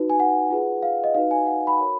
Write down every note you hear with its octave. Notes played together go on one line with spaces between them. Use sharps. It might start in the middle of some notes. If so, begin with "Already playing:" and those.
Already playing: D#4 F#4 B4
G#5
F#5
F4 G#4 B4
F5
D#5
D#4 F#4 B4 F5
G#5
F#5
B5
F#4 A#4 C#5